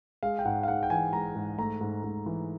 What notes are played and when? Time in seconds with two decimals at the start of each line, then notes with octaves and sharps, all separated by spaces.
0.23 G#3 F5
0.39 G5
0.45 G#2 F#5
0.63 F5
0.68 G#2 F#5
0.83 G5
0.90 E3 G#5
1.13 G#3 A#5
1.35 G#2
1.58 A3 A#5
1.81 G#2
2.04 G#2
2.26 E3